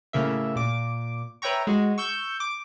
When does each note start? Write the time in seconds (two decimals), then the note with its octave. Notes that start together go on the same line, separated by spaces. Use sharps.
0.13 A2 C#3 A#3 E5
0.56 A#2 D6
1.42 B4 C#5 E5 G5 A#5 C#6
1.67 G#3 F#4
1.98 C#6 E6 G6
2.40 D6